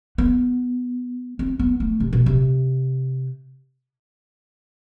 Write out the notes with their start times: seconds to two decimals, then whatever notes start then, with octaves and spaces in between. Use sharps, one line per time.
0.18 B3
1.39 C4
1.59 B3
1.80 A3
2.00 C3
2.13 B2
2.26 C3